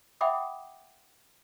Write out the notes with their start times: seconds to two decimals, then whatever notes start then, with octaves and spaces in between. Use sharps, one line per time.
0.21 E5 F#5 G5 B5 D6 D#6